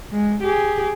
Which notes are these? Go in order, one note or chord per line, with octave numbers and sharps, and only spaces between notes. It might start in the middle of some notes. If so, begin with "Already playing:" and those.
G#3
G4 G#4